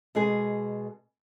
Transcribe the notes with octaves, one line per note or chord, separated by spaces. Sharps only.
B2 G#3 G#4